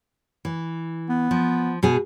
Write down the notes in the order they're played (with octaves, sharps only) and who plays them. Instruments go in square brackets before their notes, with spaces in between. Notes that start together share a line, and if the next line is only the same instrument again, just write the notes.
[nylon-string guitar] E3
[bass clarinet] B3
[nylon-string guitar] F3
B2 G#3 G#4